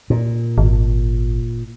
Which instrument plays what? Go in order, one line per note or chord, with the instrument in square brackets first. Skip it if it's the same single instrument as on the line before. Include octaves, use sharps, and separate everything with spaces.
[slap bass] A#2
[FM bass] G#1